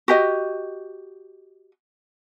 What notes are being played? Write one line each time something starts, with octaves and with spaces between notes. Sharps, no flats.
F#4 G4 D#5